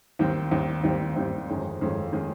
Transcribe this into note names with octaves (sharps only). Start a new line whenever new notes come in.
D#2 D#3 G3 C4
D#2 D#3 G3 C4
D#2 D#3 G3 C4
D#2 D#3 G3 C4
G1 F2 D#3 G#3 C#4
G1 F2 D#3 G#3 C#4
D#3 G#3 C#4